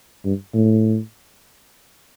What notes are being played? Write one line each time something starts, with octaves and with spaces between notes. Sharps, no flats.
G2
A2